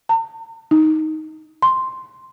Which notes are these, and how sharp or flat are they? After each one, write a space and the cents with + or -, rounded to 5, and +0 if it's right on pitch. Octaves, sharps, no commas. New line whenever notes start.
A#5 -45
D#4 +10
C6 +0